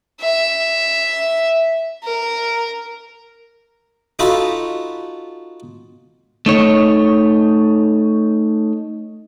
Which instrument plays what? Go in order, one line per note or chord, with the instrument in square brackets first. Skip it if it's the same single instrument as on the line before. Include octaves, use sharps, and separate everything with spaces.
[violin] E5
A#4
[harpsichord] D#4 F4 F#4 A4 B5
[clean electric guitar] A3 D#4 C#5